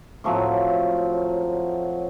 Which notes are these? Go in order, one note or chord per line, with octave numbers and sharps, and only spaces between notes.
A2 F3 F#3 C4